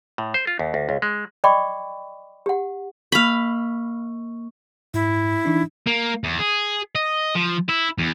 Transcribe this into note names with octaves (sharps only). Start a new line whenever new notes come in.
A2
C5
F4
D#2
D2
C#2
G#3
D5 D#5 G5 B5 C#6 D6
G4 F#5
A#3 F5 B5 C#6
G#2 E4
E3 D4 D#4
A#3
E2
G#4
D#5
F3
E4
E2